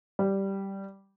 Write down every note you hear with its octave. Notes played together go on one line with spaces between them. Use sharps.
G3